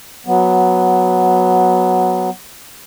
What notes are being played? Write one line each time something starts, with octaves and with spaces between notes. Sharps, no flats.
F#3 B3